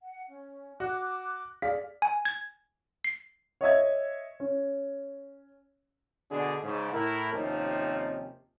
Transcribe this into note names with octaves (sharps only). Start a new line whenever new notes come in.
F#5
C#4
F#4 D6 F#6
G#4 D5 F5 B6
G#5
G#6
C7
C#5 D#5 E5 G#6
C#4
B2 D3 D4 G#4
G#2 C#3
A2 E4 A#4
D#2 C3 F3 C4 C#4 D#4